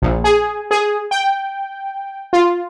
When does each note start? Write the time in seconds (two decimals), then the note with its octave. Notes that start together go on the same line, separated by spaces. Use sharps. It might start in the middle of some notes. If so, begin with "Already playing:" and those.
0.02 A#1
0.24 G#4
0.71 G#4
1.11 G5
2.33 F4